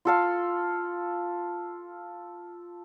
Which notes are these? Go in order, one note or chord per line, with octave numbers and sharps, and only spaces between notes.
F4 A4 F5